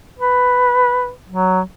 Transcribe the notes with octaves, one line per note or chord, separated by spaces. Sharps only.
B4
F#3